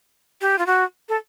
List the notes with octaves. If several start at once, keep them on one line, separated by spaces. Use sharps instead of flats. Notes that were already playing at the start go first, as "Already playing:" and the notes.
G4
F4
F#4
A4